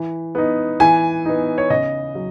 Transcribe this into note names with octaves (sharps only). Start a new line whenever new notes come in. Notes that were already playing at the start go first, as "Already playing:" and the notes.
Already playing: E3
B3 D#4
E3 G#5
B3 D#4
C#5
C#3 D#5
F#3